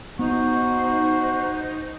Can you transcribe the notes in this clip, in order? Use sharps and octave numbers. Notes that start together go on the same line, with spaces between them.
B3 D#4 F#4 C5